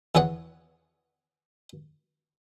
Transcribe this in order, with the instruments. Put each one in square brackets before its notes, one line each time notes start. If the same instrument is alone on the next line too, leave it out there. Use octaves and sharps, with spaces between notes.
[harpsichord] E2 E3 G#4 C#5 F#5